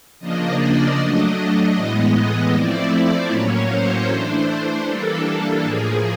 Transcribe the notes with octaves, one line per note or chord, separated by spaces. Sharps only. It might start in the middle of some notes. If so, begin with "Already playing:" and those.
C#3 F3 A#3 D4 D#5
D5
F#3 A3 D4 D#5
A2 E3 G#3 B3
F3 A3 C4 E4 D5
A2 F#3 A#3 C#4 C#5
C5
E3 A3 D4
E3 G3 A#3 D4 A4
A2 F3 A#3 G#4